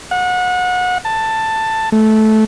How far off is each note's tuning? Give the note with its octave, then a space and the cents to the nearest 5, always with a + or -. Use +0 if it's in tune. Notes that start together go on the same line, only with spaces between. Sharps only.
F#5 -30
A5 +10
A3 -15